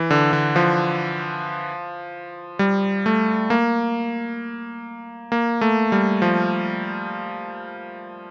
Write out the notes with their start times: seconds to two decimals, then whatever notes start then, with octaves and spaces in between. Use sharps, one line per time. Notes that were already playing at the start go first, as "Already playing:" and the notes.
Already playing: E3
0.11 D3
0.33 D3
0.56 F3
2.59 G3
3.06 A3
3.50 A#3
5.32 A#3
5.61 A3
5.92 G3
6.22 F3